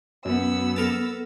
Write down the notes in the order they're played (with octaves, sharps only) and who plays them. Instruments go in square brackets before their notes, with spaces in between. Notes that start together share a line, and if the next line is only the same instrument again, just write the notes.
[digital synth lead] F#2 [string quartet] B3 E6
[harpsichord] A4 A#4 A5